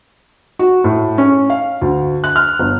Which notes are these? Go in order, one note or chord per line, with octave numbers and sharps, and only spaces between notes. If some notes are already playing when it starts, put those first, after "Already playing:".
F#4
A2
C#4
F5
D2
F#6
F6
G1